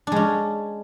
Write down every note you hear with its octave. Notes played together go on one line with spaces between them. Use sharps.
G#3 C#4 D4